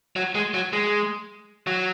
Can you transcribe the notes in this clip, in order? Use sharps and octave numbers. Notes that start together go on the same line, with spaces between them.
F#3
G#3
F#3
G#3
F#3